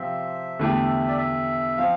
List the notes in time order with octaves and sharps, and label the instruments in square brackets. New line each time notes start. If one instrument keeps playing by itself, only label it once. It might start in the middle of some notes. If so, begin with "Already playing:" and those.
Already playing: [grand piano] C3 F3 C4 [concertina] E5
[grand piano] E2 D3 A3 E4 G4
[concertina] D5
E5
[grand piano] F3 C4 [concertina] F5